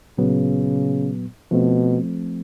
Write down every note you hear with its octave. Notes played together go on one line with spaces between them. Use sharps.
A#2 C#3 F#3 B3
B2 F3 A3 C4